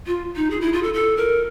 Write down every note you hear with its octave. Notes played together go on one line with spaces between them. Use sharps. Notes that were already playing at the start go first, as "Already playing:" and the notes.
F4
D#4
G#4
E4
F4
A4
A4
A#4